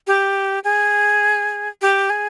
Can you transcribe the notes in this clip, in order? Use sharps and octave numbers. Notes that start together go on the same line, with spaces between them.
G4
G#4
G4
G#4